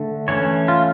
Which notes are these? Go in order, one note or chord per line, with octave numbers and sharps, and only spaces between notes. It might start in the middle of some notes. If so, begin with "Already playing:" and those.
Already playing: D3 A3
E3 A3 C#4 C#5
F4